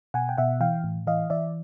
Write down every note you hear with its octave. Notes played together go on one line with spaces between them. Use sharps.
B2 F#5 G#5
G5
B2 E5 F#5
E3 F5 G5
A2
E3 D#5 F5
E3 D5 E5